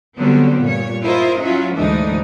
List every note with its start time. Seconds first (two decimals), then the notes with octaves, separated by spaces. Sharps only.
0.17 D3 F#3 G3 B3 C4
0.64 G2 A#2 C#5
1.03 E4 F4 A#4 C5 D#5
1.40 F#3 C#4 E4 F4
1.75 D2 G#2 E3 A3 D4 D#4